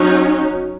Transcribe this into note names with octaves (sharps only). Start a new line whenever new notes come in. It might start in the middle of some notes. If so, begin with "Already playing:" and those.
Already playing: F#3 C#4 D#4 F#4